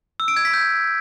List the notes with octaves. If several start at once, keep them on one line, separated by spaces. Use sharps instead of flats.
E6
D7
G#6
B6
G6